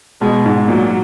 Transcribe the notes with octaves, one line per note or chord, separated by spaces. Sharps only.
B2 G#3
G#2
A#2 F#3